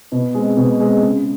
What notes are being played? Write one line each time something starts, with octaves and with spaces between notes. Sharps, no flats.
B2
G#3 C4
B2
G#3 C4
C#3